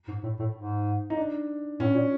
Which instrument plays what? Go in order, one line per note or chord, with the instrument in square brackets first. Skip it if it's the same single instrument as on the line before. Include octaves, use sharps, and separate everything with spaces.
[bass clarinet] G#2
A2
A2
G#2
[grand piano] D#4
D4
[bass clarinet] A2 [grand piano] C#4
[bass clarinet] A#2